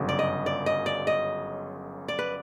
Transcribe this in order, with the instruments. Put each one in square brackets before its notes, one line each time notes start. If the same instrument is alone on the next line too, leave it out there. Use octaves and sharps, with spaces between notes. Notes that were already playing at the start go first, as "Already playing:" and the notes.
Already playing: [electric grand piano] G1 F#2 C#3
[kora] D5
D#5
D5
D#5
D5
D#5
D5
B4